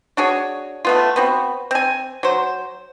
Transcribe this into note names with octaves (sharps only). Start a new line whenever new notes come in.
D4 F#4 G#4 C#5
A3 B3 F4
B3 C4 F#4
C4 G#5
F#3 C5